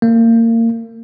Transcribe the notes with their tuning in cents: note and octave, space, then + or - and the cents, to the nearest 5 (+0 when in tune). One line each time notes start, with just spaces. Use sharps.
A#3 -30